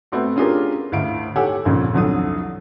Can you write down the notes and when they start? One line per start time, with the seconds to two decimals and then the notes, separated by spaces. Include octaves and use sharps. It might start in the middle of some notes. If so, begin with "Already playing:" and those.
0.12 A3 B3 C4 F#4 A4
0.36 C#4 D4 F4 G4 G#4 A#4
0.92 D2 A2 F5 D7
1.36 G4 A4 C#5 F#5 G#5 E6
1.65 A#1 F2 A#2 C#3 F3
1.94 C2 F2 F#3 D4 A4 D#6